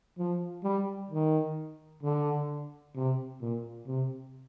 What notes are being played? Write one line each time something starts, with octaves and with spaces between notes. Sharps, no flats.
F3
G3
D#3
D3
C3
A#2
C3